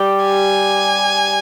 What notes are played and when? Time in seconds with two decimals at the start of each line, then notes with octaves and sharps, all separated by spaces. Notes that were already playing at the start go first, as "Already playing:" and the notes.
Already playing: G3 G4
0.25 G#5